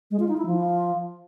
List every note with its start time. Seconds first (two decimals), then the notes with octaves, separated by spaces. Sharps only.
0.11 G#3
0.20 F4
0.29 D#4
0.37 E4
0.46 F3